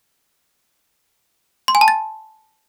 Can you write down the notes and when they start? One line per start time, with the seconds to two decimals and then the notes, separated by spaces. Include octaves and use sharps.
1.68 C6
1.75 G#5
1.81 A5
1.88 A6